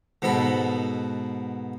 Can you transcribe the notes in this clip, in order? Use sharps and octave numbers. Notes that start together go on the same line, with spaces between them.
G#2 B2 B3 A4 B5